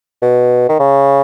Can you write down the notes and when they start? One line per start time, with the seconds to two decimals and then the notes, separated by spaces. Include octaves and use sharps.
0.22 B2
0.69 D#3
0.79 C#3